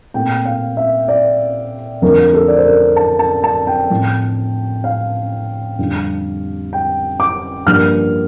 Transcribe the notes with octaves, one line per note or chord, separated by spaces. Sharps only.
A#2 A3 C4 G5
F5
E5
D5
F2 D3 F3 A3 C4 A#4
A4
D5
C5
A#4
A5
A5
A5
G5
A2 F3 C4
F5
F2 D3 G3 C4
G5
D6
G2 F3 A#3 F6